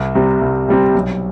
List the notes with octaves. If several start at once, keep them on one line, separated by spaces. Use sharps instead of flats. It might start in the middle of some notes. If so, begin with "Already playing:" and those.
Already playing: C2
C3 G3 C4
C2
C3 G3 C4
B1